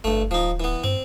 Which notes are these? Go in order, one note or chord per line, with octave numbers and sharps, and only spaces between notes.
G1 G2 A3
D1 F3 D#4
E3 B3
G2 C4